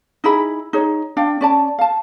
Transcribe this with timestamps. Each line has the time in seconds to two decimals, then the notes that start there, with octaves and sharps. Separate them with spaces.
0.24 D#4 E4 G#4 B5
0.73 D#4 G#4 C#5
1.17 D4 F5 G5
1.41 C#4 D5 A5
1.78 F5 A5